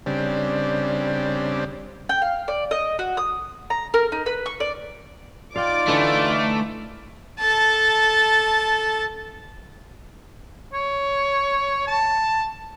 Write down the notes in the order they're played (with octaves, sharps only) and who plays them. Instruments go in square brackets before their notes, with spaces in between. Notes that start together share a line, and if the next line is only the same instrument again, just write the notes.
[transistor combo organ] C#3 G3 C4 D4
[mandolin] G5
F5
D5
D#5
F#4
D#6
A#5
A#4
D#4
B4
C#6
D5
[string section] D#4 D6 [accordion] F4 D5 [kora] F5 G5
[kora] D3 E3 [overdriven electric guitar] A3
[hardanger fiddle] A4 A5
[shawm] C#5
A5